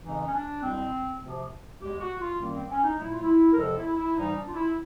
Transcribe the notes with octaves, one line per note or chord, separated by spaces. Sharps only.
F2 C#3 E3 G#3 D#4
C#4
D4
C2 B2 G#3 C4
D2 C3 F3
E2 B2 G#3 G4
F#4
F4
F#2 D#3 G3 A#3
C4
C#4
D#4
A#2 F#3 A3 E4
F4
E4
A#4
E2 C3 F3 G#3 A4
E4
E4
G#2 E3 G3 D#4
D4
F4
E4